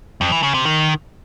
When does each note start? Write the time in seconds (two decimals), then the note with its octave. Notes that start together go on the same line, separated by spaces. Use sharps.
0.21 F2
0.32 E3
0.43 C#3
0.54 C3
0.65 D#3